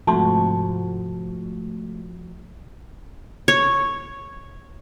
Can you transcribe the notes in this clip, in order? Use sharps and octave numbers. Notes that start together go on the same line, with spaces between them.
G#2 C3 F3 A3 F#4 A5 C6
C#5